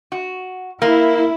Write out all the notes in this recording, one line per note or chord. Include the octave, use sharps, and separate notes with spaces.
F#4
A#3 E4